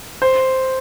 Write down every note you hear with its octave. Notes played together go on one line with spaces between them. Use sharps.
C5